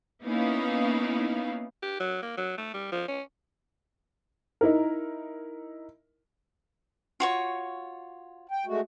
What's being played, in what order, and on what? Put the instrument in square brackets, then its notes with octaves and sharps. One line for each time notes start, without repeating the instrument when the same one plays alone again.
[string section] A#3 B3 C#4 D#4 E4 F5
[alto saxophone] G4
F#3
A#3
F#3
A3
G3
F3
C#4
[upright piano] D#4 E4 A#4
[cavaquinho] F4 F#4 C#5
[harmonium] G5
G#3 A3 F#4